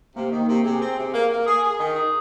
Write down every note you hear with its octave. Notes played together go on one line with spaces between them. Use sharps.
C3 A#3
D#3
C3
C3 G#4
C4
C3
A#3 A#4
A#3
G#4
G#4
D#3
G#4